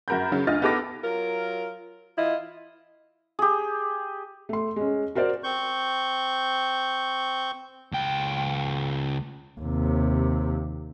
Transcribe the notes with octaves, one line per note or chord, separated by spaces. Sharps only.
F#2 F#4 A#4 B5 G6
C#3 F#3
D2 D3 F4 D#5 F6 A6
B3 D#4 G4 A4 D6 A#6
F#3 F4 A#4
E3 E4 F4 D#5
G4 G#4
A3 C6
G#3 C#4
F#4 A#4 C5 D5
C4 C#6 G6
C#2 G5
D#2 C3